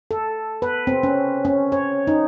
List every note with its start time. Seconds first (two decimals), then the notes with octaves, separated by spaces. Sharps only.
0.11 A4
0.62 B4
0.87 C4
1.03 C#4
1.45 C#4
1.72 C#5
2.07 D#4